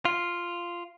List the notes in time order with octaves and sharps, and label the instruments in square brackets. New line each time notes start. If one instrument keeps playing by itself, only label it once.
[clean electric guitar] F4